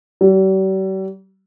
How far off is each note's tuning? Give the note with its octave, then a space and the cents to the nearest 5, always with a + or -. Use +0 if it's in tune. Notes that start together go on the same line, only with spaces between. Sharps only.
G3 -45